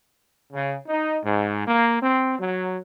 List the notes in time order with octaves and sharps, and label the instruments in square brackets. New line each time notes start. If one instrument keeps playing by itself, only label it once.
[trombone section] C#3
D#4
G#2
A#3
C4
F#3